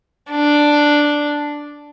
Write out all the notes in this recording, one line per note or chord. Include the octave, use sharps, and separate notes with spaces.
D4